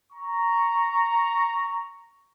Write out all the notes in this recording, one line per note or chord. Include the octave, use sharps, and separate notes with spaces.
A#5 C#6